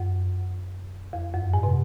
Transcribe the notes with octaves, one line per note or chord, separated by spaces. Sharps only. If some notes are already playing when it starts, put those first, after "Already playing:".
Already playing: F#2
F2
F#2
G#2
C3